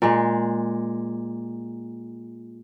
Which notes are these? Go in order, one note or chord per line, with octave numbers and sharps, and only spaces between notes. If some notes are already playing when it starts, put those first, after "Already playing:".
A#2 G#3